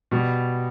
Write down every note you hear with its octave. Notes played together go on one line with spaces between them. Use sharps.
B2 G3